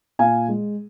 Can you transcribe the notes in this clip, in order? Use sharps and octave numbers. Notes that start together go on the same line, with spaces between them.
A#2 F5 G#5
G#3